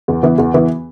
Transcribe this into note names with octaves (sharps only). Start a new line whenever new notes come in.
E2
E3 B3
E2
E3 B3